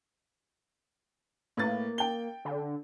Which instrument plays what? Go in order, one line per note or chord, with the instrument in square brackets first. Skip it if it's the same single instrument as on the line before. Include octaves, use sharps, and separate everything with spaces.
[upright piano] A2 B4 A6 [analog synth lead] A#3
[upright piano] G5 G7
[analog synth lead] D3